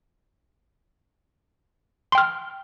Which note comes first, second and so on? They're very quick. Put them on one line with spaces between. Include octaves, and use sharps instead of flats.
C6 G5 F6